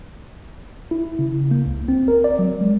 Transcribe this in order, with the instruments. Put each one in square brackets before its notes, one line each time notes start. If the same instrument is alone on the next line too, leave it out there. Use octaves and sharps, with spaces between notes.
[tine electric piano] E4
C#3
A#3
C#2
C4
A#4
D5
F#3
G#3